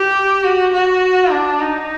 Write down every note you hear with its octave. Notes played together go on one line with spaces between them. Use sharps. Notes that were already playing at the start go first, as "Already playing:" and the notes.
Already playing: G4
F#4
F#4
D4
D#4